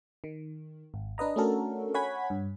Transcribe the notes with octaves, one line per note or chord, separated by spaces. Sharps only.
D#3
G#1
D4 B4 D#5 A#5
A3 C#4 D4 F#4 A4 A#4
C#5 F#5 G#5 B5 G#6 B6
G2